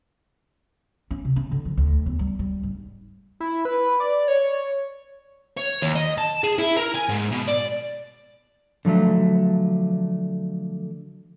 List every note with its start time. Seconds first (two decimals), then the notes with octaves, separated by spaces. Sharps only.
1.11 C#4
1.25 C3
1.36 C#4
1.51 D3
1.65 F3
1.77 D2
2.06 E2
2.19 G3
2.39 G3
2.63 G#2
3.40 E4
3.65 B4
4.00 D5
4.28 C#5
5.57 C#5
5.82 D#2
5.96 D#5
6.18 A5
6.44 G#4
6.58 E4
6.76 A#4
6.95 G#5
7.09 G#2
7.32 B2
7.47 D5
8.85 D3 F3 F#3 A3